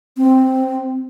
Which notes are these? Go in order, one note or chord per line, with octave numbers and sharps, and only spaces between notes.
C4